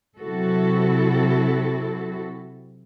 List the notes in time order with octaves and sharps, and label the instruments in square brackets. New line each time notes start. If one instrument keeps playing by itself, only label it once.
[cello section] C3 F#3 E4 F#4 A4